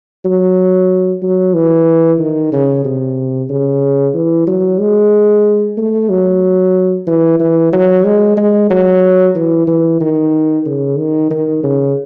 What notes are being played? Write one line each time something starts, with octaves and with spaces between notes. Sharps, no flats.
F#3
F#3
E3
D#3
C#3
C3
C#3
E3
F#3
G#3
A3
F#3
E3
E3
F#3
G#3
G#3
F#3
E3
E3
D#3
C#3
D#3
D#3
C#3